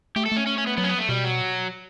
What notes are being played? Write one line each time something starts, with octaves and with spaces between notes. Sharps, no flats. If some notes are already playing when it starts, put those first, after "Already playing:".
A3 G4
A4
A3 C#4
C#4
C#4
B3
F#3 B3
C#4
B3
A3
B2 G3
F#3